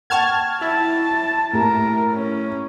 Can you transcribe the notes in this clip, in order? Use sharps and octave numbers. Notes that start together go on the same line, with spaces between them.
F#5 G5 A5 C#6 F6 G#6
E4 A5
A2 G4 A#4 A#5
C#4